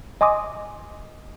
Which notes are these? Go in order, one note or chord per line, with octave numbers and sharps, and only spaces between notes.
D#5 G#5 C6 D6 D#6